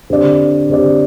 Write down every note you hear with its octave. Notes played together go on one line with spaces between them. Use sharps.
D3 C4 G4 D5
D3 C4 G4 D5